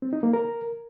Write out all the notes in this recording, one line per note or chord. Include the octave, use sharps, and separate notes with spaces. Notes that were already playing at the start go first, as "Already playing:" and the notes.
C4
D#4
A#3
A#4